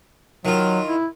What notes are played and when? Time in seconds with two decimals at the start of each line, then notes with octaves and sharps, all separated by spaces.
0.45 D#3 F#3 F4
0.88 E4